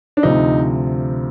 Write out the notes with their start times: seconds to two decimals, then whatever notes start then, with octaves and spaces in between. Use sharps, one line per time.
0.17 D4
0.23 D2 C3 F3 D#4